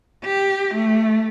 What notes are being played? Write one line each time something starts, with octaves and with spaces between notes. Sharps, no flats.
G4
A3